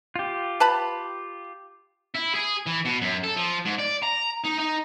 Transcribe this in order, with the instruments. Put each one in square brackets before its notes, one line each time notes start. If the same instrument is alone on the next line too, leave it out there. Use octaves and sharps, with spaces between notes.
[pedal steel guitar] F4 G4
[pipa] B4 A5 B5
[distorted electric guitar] E4
G#4
E3
B2
F#2
A4
F3
G#2
D5
A#5
D#4
D#4